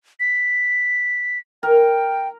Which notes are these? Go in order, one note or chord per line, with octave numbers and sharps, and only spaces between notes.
B6
A#4 G5